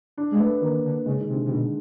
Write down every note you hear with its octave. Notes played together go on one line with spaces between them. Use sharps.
D4
G#3
A3 B3
D#3 A#3
D3
C#3 G#3
D#3
C3
D3
C3
B2 D3